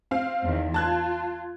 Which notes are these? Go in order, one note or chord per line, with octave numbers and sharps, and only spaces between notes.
C4 F5
E2 D#3
F4 A5 F#6 G#6